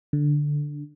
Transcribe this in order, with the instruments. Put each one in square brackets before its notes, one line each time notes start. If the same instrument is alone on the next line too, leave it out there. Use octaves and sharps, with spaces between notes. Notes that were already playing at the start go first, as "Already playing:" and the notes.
[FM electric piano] D3